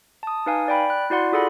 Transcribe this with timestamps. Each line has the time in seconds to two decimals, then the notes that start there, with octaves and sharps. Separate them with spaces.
0.23 A5 D#6
0.46 D#4 B4 F5 G#5
0.68 D5 G5 B5
0.90 F#6
1.10 E4 F#4 D5 F#5 C6
1.32 F4 G#4 A4 D5 F#5 B5